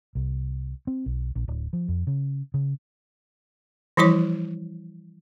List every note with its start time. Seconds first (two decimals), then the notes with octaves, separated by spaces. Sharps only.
0.15 C2
0.87 C4
1.06 B1
1.35 A#1
1.48 D1
1.73 F3
1.88 F2
2.07 C#3
2.54 C#3
3.97 E3 F3 G3 E4 C#5 D6